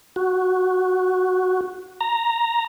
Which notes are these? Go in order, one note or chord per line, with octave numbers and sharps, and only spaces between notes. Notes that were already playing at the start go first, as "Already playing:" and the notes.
F#4
A#5